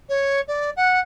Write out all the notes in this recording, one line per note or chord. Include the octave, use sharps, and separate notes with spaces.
C#5
D5
F#5